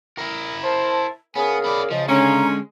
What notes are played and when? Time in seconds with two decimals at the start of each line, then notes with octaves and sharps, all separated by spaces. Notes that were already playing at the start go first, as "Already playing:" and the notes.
0.18 E4 A#4
0.63 C5 A5
1.36 C#3 B3 G#4 A#4 G#5
1.64 B3 D5 B5
1.91 C#3 F3 D#5
2.08 D3 G#3 C#4 A#5